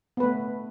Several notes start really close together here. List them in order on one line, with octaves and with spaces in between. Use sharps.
B3 B4 A3